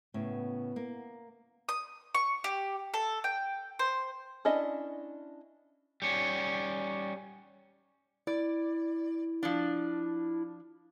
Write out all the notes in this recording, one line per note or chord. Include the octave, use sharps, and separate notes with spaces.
A2 C#3 B3
A#3
D#6
C#6
G4
A4
G5
C5
C#4 D4 E4 D#5 E5
G3 C#4
E4 D5
F3 D4